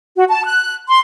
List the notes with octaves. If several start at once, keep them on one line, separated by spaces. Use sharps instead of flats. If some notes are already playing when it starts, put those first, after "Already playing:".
F#4
A5
F#6
C6